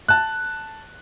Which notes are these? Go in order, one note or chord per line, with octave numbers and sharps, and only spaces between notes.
A5 F#6